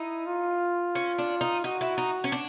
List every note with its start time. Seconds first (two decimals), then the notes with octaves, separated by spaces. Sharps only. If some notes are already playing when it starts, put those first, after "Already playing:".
Already playing: D#4 E4
0.26 F4
0.95 C#4
1.18 D4
1.41 D#4
1.64 D#4 F#4
1.81 E4
1.98 D#4
2.24 C#4
2.32 D4